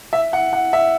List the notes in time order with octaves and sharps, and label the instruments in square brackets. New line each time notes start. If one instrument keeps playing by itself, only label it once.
[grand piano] E5
F#5
F#5
E5